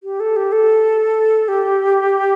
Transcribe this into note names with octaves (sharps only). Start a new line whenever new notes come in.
G4
A4
G4
A4
G4